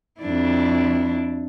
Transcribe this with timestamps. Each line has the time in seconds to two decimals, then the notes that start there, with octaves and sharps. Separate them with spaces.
0.21 F2 D4 E4